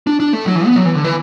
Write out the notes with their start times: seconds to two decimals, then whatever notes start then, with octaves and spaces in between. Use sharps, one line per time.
0.07 D4
0.20 D4
0.33 A3
0.46 F#3
0.55 E3
0.66 B3
0.76 F#3
0.85 E3
0.95 D3
1.04 E3